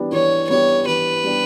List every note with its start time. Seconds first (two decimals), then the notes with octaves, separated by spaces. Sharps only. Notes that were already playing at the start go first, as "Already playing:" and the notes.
Already playing: E3 G3 B3 D4 G4
0.12 E3 C#5
0.49 G3 B3 D4 G4 C#5
0.87 E3 B4
1.24 G3 B3 D4 G4